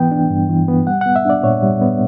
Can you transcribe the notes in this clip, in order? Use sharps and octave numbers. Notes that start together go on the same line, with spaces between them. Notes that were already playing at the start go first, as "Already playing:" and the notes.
Already playing: E3 B3 G5
D4
G2
E3
B3
G3 F#5
B3 F#5
E5
D4 D5
A#2 C#5
G3
B3